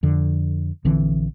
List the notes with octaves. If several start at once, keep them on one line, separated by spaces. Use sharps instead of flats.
F2 D3
A#1 D3 E3 C4